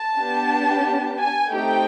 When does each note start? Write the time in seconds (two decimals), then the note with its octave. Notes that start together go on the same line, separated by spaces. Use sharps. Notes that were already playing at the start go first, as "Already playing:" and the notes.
Already playing: A5
0.19 B3 D4 G4
1.19 G#5
1.51 A3 C4 D#4 G4 G5